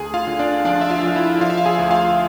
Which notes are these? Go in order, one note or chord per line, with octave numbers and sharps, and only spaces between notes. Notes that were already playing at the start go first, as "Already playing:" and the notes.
Already playing: D2 G#4 G#5
F4 F5
D3
D4 D5
F3 D4 D5
E5
F4 F5
F3 F5
E4 E5
F3 F4 F5
E5
F5
G#4 G#5
D2
F4 F5